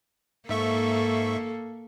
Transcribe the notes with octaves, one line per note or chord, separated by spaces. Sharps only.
G#2 A#3 A4 E5 C#6